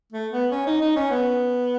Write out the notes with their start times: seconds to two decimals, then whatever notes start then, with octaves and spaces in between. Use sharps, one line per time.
0.13 A3
0.32 B3
0.52 C#4
0.67 D#4
0.81 D#4
0.96 C#4
1.11 B3